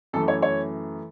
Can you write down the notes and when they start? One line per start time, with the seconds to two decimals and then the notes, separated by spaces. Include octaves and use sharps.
0.13 F#2 E3 A3 A4
0.28 C#5
0.42 C#5